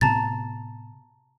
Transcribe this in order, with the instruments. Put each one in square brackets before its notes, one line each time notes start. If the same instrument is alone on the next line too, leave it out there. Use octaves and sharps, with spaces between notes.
[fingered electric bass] A2 C3 B3 [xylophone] A5 A#5 A6